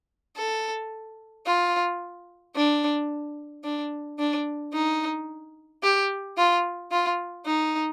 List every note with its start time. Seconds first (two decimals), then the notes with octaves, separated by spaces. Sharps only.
0.37 A4
1.46 F4
2.55 D4
3.64 D4
4.19 D4
4.73 D#4
5.83 G4
6.37 F4
6.91 F4
7.46 D#4